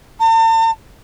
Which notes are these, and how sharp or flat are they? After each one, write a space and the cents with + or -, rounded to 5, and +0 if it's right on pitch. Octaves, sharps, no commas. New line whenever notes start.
A5 +45